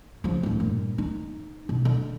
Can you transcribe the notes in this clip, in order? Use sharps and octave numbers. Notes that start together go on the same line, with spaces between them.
C#3 F3
A2 F3
G2 A#2
D#4
B2
D3